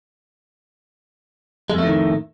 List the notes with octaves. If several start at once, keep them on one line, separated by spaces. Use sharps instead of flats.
F2 A2 D#3 G#3 A3